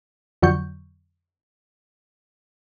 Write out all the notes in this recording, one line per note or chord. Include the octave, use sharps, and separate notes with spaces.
F2 D3 F#3 C#6 G6